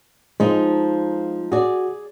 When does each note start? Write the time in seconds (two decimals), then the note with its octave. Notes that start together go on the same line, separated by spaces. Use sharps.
0.40 F3 G#3 D#4
1.52 F#4 G#4 D5